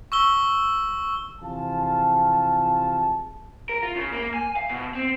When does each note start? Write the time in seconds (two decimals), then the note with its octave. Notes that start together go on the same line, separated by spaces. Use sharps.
0.12 C#6 E6 G7
1.41 C3 E3 F3 F4 G#4 A5
3.69 A#4
3.83 F4
3.96 C#3
4.12 A#3
4.34 G#5
4.56 F5
4.69 B2
4.94 C4